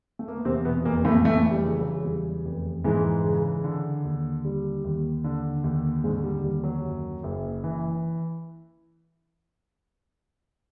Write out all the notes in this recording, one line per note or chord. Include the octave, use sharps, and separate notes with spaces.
A3
A#3
B3
E2 C3 C4
B2 B3
F1 A#2 A#3
A2 A3
A2 E3 A3
G3
C#3
F#3
G#3
E2 G3
F1
G#2 E3 G#3
C#3
D3
D#2
D3 G3
D#2
D3
D#2
G#2 D3 G#3
G3
D#2 G3
F#3
F#2
F#1
E3